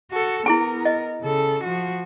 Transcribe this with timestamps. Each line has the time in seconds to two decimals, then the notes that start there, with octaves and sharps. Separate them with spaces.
0.11 F#4 A4
0.46 B3 E4 G#4 A#4 G#5
0.85 D#5
1.22 C#3 A4
1.64 F3 F#4